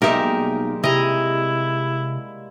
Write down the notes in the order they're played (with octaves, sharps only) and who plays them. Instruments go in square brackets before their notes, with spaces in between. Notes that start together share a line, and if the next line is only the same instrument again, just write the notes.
[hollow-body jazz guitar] B1 E5 [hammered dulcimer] G3 G#3 A#3 [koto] D#4 G4 A#4
[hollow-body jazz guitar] C3 [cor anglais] E4 [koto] D#5 A#5